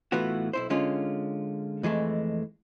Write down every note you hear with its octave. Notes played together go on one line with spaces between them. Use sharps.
A2 E3 B3 F4 F#4
B1 E4 C5
D3 G#3 C#4 F4
F2 E3 G#3 A3